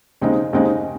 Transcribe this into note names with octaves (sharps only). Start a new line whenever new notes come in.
D#2 C#3 G#3 C4 D#4
D#2 C#3 G#3 C4 D#4